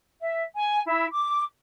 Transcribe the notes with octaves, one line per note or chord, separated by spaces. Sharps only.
E5
G#5
E4
D6